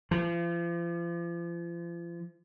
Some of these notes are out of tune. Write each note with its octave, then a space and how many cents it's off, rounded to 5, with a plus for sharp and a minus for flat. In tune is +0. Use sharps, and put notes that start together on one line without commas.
F3 -40